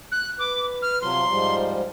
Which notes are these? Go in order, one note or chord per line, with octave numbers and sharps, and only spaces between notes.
F#6
B4 D6
F6
C3 F3 F#3 C6
G#2 F3 G3